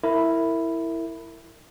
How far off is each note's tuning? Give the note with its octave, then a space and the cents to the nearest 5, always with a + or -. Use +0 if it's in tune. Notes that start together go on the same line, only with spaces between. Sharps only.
E4 +0 A#4 -30